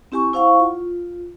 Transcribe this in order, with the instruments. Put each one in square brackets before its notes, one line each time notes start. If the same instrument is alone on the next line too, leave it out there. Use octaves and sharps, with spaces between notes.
[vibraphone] C4 E4 G4 G#5 C#6
E4 C5 F5 F#5 C#6
F4